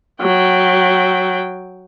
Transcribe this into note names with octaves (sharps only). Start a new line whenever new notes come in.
F#3 G5